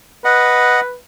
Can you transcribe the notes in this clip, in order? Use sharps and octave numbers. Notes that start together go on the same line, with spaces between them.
B4 D#5 F#5